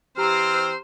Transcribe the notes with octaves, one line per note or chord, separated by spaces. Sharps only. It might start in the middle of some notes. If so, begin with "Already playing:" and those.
E3 C4 G4 C5 A#5 F6 C7